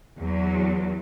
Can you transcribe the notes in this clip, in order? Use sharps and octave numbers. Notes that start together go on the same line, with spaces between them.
E2 F#3